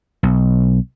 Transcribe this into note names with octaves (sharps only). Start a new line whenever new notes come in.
B1